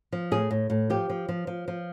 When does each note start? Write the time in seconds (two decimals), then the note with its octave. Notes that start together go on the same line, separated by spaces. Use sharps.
0.12 F3
0.31 A2 G#4
0.51 A2
0.70 A2
0.90 F3 G4
1.10 F3
1.29 F3
1.47 F3
1.68 F3